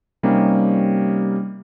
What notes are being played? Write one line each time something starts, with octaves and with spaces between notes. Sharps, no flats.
C3 G3 A#3 C#4 D#4